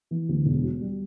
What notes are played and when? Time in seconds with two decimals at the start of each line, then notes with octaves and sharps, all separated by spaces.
0.11 E3
0.29 D2
0.45 E1
0.63 F#3
0.81 G3